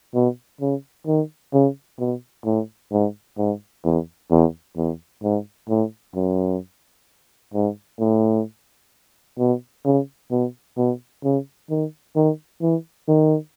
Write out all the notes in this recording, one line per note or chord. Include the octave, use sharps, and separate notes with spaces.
B2
C#3
D#3
C#3
B2
A2
G#2
G#2
E2
E2
E2
G#2
A2
F#2
G#2
A2
B2
C#3
B2
B2
C#3
D#3
D#3
E3
D#3